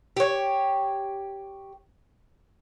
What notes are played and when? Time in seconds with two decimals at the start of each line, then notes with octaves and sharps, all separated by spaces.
0.17 G4 C#5